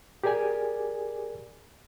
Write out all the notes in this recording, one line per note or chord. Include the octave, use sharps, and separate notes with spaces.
G4 G#4 A#4 D5 G#5